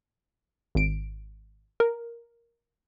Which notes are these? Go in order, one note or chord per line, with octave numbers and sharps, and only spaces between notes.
G#1 D7
A#4